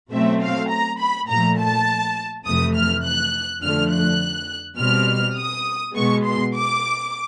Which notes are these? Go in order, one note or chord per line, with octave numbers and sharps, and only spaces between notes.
B2 F#3 A3 C4 E5
F5
A#5
B5
A#2 F3 A3 A#5
A5
F2 C3 E3 A3 D#6
F6
F#6
F2 D3 F3 A3 F6
F#6
B2 G3 C4 F6
D#6
B2 G#3 B3 C#6
C6
D6